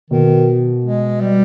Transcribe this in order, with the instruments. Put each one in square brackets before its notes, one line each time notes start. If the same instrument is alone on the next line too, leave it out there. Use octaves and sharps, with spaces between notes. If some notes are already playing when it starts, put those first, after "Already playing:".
[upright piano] B2 [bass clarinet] D#3
[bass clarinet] G#3
G3